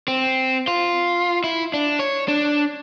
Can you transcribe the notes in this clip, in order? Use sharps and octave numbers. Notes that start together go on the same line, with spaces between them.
C4
F4
E4
D4
C#5
D4